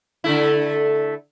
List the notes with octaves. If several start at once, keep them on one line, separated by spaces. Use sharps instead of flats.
D3 A3 E4